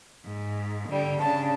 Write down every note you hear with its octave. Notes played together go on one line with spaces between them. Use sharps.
G#2
D3 G3
C#3 D4 A5